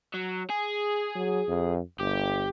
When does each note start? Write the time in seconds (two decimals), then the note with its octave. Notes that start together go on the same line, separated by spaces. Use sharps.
0.14 F#3
0.50 G#4
1.15 F#3
1.48 F2
2.00 G1 G4